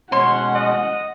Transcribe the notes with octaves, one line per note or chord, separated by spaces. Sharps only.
B2 G#3 C#4 C#5 F#5 C6
D#5